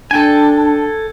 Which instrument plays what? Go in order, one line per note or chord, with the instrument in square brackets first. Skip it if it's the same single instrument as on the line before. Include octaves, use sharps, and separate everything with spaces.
[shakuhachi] D4 [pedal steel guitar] A4 G5 G#5